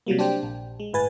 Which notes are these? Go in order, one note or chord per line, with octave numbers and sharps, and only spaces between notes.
C3 F#3 G3 A#3
D4 G4 C5 G5
A#1
G#3
G1 A2 B4 G#5 A6